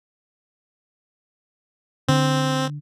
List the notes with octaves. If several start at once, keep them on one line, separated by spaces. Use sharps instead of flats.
D3 C4